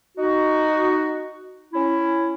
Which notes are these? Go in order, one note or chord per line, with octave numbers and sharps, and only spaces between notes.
D#4 F#4
C#4 E4